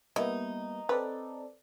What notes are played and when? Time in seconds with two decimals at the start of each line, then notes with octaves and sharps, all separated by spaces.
0.16 G3 A#3 B3 D#4 E4
0.89 C4 A4 B4 D5